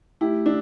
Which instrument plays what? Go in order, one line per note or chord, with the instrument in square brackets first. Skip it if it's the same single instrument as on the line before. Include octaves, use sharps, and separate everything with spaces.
[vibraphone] A3 [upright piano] E4 G4
[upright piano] D4 [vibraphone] E4